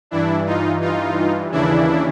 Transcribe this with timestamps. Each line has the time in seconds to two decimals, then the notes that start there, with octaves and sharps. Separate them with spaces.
0.11 G2 E3 D4 E4
0.46 D#4 F4
0.81 D#4 F4
1.52 D#2 C#3 E3 D4 E4